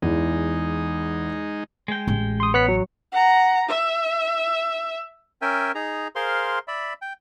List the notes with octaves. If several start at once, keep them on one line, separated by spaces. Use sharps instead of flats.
E2 E3 G#3 D#4
G#3 G5
A1 C#4
C6 D#6
B3 C#5 F#6 B6
F#3
F#5 A#5
E5
C#4 A#4 E5 G5 G#5
D#4 G#4 A#5
G#4 A#4 C5 F5 C6
D5 E5 B5
G5